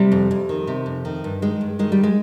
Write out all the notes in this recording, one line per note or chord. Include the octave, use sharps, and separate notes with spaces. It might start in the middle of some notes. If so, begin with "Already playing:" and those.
Already playing: C3 G3
F2
F2
D#3
C3
F2
D#3
G2
D#3 G#3
G2
D#3 G#3
G3
G#3